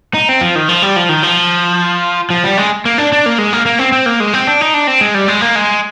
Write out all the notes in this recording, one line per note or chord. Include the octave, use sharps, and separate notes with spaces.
D#4
C4
F3
D#3
F3
G3
F3
D#3
F3
F3
G3
G#3
A#3
D4
D4
A#3
G#3
A#3
A#3
C4
C4
A#3
G#3
C4
D4
D#4
D4
C4
G#3
G3
G#3
A#3
G#3